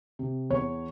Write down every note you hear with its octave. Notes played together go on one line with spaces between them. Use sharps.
C3
E2 C#5